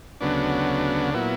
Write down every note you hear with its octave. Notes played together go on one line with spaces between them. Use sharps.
D2 C#3 F#3 B3 D4
A#2 F#3 B3 E4